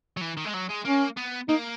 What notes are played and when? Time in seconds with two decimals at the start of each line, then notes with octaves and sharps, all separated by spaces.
0.17 F#3
0.21 E3
0.37 D#3
0.45 G#3
0.54 F#3
0.69 G#3
0.85 A#3 C#4
1.17 B3
1.49 A#3 D#4